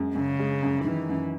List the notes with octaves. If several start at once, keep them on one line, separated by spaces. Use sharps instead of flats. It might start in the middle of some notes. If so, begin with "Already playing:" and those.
Already playing: F#2 G#3
F#2 C#3
G#3
F#2
D#3 E3
F#2